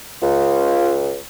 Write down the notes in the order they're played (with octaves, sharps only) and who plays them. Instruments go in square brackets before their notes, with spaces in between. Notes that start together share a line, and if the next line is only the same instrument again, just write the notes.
[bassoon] C#2 [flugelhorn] F4